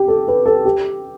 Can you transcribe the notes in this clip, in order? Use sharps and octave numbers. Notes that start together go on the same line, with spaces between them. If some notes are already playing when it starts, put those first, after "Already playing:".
Already playing: G4
A4
B4
A4
G4